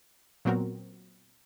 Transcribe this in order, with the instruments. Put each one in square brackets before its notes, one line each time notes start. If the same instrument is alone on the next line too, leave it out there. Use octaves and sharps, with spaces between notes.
[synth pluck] A#2 F#3 B3 C4 F#4 A#4